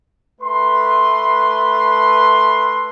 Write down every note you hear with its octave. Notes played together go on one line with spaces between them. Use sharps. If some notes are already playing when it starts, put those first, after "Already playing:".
A3 B4 C6